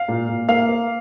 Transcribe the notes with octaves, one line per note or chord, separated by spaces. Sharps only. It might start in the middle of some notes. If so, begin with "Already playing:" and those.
Already playing: F5
A#2
A#2
A#3 F5
A#3